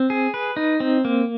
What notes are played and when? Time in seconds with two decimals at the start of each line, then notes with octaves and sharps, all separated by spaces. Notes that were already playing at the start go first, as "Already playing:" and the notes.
Already playing: C4
0.10 G#4
0.34 B4
0.57 D#4
0.80 C4
1.05 A#3